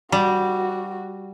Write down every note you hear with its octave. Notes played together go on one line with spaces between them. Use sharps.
G3 F#4